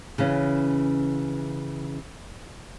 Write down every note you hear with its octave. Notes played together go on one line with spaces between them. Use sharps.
C#3 E3 C#4